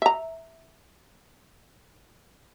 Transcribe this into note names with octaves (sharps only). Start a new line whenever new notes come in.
E5 A#5